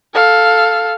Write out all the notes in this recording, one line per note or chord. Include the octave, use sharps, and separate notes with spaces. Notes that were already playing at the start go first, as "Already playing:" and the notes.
A4 F5